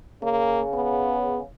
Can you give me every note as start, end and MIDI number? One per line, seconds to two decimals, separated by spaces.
0.23 1.45 49
0.23 0.62 58
0.74 1.40 59